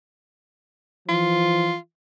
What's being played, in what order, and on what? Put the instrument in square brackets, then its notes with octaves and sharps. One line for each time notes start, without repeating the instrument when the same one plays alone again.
[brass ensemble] E3 F3 [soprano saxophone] F4